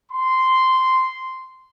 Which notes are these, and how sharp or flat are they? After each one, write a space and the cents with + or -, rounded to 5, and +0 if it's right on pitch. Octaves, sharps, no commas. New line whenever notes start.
C6 -10